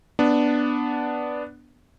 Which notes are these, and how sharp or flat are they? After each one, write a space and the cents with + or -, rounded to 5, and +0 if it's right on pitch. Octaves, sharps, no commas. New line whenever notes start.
B3 +0 D4 +0